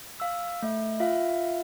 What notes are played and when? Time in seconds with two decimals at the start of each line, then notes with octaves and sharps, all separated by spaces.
0.20 F5 E6
0.63 A3 E5
1.00 F4 E5 F5